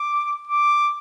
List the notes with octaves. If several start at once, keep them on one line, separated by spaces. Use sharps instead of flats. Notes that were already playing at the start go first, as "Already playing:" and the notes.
Already playing: D6
D6